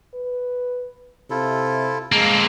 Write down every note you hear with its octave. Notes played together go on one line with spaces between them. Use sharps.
B4
C3 E4 F4 A4
G#3 A#3 C4 F5 A5